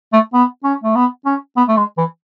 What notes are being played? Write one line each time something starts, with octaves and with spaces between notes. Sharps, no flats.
A3
B3
C#4
A3
B3
C#4
B3
A3
G#3
E3